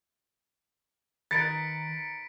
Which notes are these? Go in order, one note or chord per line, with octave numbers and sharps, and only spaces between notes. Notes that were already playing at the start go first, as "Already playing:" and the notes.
D#3 D#4 A#4 B4 A6 B6 C#7 D7